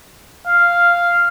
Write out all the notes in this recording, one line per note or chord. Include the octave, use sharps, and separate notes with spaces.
F5